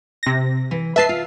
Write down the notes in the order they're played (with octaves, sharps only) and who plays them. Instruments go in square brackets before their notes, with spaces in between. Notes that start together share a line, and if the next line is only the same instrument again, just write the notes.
[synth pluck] C3 A#6
[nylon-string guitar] E3
[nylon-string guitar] B4 D#5 [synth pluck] E5 A5 C7
[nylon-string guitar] F4